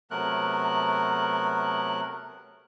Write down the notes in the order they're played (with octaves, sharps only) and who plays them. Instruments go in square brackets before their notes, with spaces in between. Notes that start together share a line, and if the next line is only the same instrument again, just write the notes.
[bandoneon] C3 F#3 A3 B3 A#4 F#6